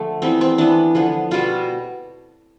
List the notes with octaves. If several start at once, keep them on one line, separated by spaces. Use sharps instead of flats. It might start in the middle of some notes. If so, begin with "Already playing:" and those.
Already playing: D3 F3 A3
E3 G3 B3 C4
C4
E3 B3 D4
D3 F3 B3
B2 G3 B3 F4